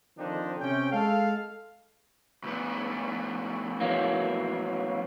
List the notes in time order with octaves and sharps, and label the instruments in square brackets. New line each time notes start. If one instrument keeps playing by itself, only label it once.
[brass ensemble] D3 D#3 F3 C4 D4 D#4
C3 C#4 G5
G#3 A4 F5
[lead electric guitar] D2 B3
[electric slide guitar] E3 F#3 A#3